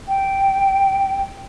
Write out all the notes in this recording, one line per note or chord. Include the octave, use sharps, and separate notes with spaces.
G5